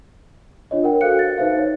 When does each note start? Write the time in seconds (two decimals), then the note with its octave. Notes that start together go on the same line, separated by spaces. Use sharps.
0.71 D4 F4 C#5 D#5
0.84 A#4 F#5 G5
1.01 F#4 A4 C5 F5 F#6 C#7
1.19 A6
1.38 D#4 B4 C5 E5 F5
1.57 D#4 C#5